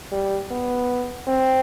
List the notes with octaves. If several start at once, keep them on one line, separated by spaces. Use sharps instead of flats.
G3
B3
C4